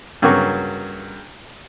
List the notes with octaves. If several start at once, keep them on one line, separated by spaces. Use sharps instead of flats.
G2 C#3 F#3 A#3 F#4 C#6